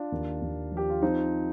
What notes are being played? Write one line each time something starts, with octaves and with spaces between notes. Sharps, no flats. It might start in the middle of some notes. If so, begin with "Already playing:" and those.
Already playing: D4 F4
D#2
D#2
F3
G4
F4
F3 C4 D#4